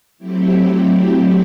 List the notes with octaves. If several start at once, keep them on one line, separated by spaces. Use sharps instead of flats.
F#3 A3 C4 E4 G4